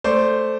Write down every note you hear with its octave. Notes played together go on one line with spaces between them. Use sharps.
A3 C5 D5